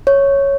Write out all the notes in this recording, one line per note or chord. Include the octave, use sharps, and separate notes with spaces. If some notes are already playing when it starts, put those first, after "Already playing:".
C#5